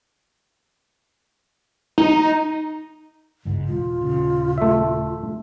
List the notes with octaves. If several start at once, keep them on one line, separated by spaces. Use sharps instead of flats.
D#4
G1 C#2 G#2
E1 F4
D#1 C#3
A3 E5